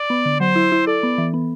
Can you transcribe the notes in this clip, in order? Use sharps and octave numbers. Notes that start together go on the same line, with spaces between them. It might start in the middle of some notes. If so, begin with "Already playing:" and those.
Already playing: D5
B3
D3
F#3 C5
E4
E4
A4 D5
B3
E3
B3